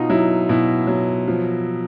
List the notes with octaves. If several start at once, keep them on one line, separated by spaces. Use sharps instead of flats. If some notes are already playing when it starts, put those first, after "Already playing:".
Already playing: B2 D#4 F4
F#3 E4
B2 E4
F#3
F3